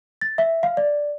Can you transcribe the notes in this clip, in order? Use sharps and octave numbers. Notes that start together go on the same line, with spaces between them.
A6
E5
F5
D5